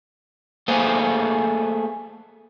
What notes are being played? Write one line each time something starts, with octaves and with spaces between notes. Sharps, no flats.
A3 A#3 G#4 B4 C5